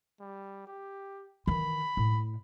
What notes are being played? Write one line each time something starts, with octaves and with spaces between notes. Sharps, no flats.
G3
G4
D#3 E3 B5
A2